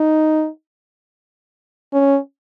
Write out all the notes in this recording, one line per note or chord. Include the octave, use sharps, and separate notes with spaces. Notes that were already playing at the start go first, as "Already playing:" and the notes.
Already playing: D#4
C#4